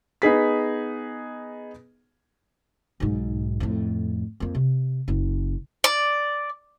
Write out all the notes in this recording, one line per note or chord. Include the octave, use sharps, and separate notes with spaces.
B3 D#4 G#4 B6
B1 G#2
F2 A2
F2 A#3
C3
F#1
D5